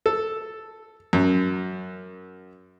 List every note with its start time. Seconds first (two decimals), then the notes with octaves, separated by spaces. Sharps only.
0.06 A4
1.13 F#2